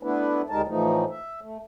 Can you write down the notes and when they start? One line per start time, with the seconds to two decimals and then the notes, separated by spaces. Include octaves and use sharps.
0.03 A3 B3 D4 E4 B4
0.50 D2 G3 G#3 D#4 A#4 A5
0.68 A2 E3 F3 A3 D#4
1.10 E5
1.41 A3